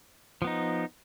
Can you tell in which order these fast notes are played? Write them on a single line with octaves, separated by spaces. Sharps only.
F3 B3 D#4